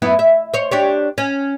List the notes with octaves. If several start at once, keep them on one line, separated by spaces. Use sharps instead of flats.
F#2 B3 E4
E5
C5 C#5
D4 G4 C#5
C#4